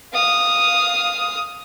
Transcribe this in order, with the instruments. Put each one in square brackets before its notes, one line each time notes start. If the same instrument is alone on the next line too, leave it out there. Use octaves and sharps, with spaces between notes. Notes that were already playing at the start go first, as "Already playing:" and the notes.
[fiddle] F5 D#6